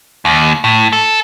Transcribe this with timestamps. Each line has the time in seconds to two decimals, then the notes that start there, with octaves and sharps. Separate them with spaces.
0.25 D#2
0.64 A2
0.93 A4